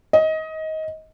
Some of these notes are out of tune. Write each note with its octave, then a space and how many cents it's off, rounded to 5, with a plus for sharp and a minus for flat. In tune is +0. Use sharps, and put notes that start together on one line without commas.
D#5 +20